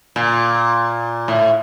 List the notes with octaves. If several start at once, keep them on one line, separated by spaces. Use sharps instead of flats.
A#2
A2